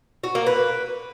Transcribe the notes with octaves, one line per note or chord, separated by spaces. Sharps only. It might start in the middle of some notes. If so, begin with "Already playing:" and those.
F#4
A#3
B4